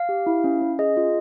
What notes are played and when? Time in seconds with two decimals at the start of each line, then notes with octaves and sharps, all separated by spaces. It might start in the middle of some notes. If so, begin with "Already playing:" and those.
Already playing: F5
0.09 G4
0.27 E4
0.44 C#4
0.61 C#4
0.79 G#4 D#5
0.97 F4